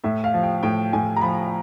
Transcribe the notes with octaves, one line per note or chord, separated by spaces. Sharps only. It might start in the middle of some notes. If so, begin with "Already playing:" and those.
A2 E5
F5
F3
G5
A2 G5
A2 G#5
A#5
F3 B5